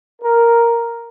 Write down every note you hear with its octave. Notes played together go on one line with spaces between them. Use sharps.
A#4